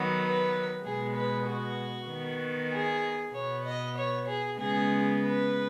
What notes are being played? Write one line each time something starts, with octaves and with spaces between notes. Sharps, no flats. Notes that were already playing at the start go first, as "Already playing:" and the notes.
Already playing: D#3 F#3 B3
B4
B2 G#3 B3 G#4
B4
F#4
D#3 B3
G#4
B2 B3 C#5
D#5
C#5
G#4
C#3 G#3 B3 G#4
B4